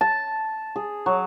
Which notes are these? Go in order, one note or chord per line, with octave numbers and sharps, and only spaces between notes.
A5
G#4
F#3